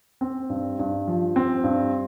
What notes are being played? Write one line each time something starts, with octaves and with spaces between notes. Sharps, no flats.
C4
G2
G2
F3
C4
G2